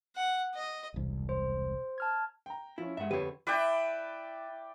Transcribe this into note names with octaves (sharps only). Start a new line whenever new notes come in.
F#5
D#5
E1 C2
C5
A5 F6 G#6
G5 A#5
F3 C#4 E4
G2 G#3 E5 F#5
F2 D3 G4 B4 C#5
E4 B4 D5 G5